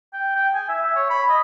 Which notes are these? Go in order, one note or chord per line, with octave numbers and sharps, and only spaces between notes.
G5
G5
G#5
E5
E5
C#5
B5
D#5